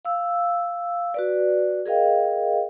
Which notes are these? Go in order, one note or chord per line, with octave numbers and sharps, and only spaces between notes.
F5 E6
F#4 B4 D5
G#4 A#4 D#5 F5 G5